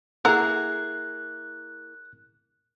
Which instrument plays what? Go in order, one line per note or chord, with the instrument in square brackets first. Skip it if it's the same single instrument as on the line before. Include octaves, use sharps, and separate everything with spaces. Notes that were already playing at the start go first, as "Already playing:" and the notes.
[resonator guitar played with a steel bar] A#3 E4 G#4 [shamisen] A4 F#5 A#5 [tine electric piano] F#6